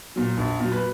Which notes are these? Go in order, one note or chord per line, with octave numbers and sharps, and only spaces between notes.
A#2 F#3
A#1
A#2 F#3
B4